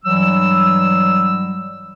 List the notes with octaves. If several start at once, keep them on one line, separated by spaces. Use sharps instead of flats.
G2 E3 F#3 G3 E6